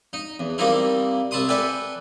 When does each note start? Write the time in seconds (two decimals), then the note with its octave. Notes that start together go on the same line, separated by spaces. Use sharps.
0.13 D#4
0.39 E2
0.58 G3 A#3 C4 D#4 E4
1.31 C2 E5 A5 B5 C6 D#6
1.48 A4 B4 D5 E5 G5 G#5